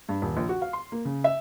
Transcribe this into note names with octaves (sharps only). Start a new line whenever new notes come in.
G2
D#1
A#1
F#4
F5
C6
A#3
C#3
E5